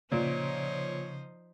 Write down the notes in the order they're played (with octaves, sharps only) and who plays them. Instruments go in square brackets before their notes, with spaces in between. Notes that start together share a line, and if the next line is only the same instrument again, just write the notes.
[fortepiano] A#2 [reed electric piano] C#3 [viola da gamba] F3 D#4 C5 [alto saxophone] C#5